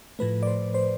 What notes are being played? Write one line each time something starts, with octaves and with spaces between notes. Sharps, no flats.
A2 F3 A3 B4
D5
C5
C5